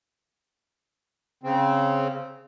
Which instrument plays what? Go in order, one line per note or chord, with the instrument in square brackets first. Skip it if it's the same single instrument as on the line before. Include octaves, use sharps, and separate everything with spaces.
[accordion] C#3 C4